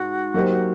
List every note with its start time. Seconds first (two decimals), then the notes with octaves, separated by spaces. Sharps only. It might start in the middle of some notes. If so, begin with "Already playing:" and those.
Already playing: G#2 F#4
0.34 F#3 A#3 D#4 G4 C5